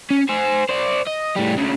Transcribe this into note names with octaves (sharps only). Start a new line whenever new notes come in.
C#4
C5 G#5
C5 D5
D#5
A2 G3
D2 C#3